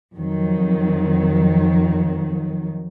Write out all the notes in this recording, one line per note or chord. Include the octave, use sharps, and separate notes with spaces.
F2 D#3 F#3